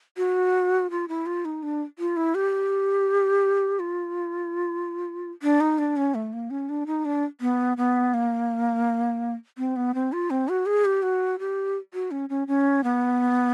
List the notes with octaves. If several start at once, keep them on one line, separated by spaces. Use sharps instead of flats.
F#4
F4
E4
F4
D#4
D4
F4
E4
G4
F4
D4
D#4
D4
C#4
A3
A#3
C#4
D4
D#4
D4
B3
B3
A#3
C4
B3
C4
F4
C4
F#4
G#4
G4
F#4
G4
F#4
C#4
C#4
C#4
B3